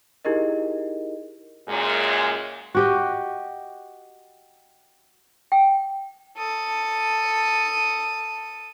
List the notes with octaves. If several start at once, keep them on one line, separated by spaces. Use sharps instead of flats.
D#4 E4 G4 G#4 A#4 D#5
F#2 A#2 G#3
F#4 G4 D#5
G5
A4 D#6